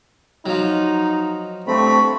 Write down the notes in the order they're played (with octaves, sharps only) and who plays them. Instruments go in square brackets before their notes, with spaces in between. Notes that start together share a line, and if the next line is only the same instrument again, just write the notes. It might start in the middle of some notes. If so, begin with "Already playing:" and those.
[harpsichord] F3 F#3 [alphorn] D#4
[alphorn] G2 [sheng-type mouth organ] A3 C4 B5 [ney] C#6